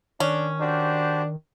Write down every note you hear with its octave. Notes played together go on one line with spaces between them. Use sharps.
D#3 C#4 D4
D4 F#4 G4 C5